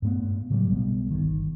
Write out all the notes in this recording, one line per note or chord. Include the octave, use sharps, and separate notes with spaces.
G2 A#2 A3 B3
A2 C#3 F#3 G3
B1 B2 G3 B3
G1 D#3